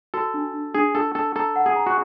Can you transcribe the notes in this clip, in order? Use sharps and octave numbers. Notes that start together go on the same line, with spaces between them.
F#4 A4
D4
D4
D4 G#4
D4 A4
D4 A4
A4 A#5
F#5
G#4
A#5
F#4